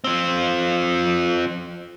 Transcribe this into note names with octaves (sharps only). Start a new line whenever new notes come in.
F3 C4